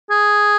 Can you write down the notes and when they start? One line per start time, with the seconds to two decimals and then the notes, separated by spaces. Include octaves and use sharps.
0.10 G#4